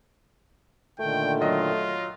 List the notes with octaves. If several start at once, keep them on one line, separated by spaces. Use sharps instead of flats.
A#2 D3 D#3 A3 G5
F#3 F4 D#5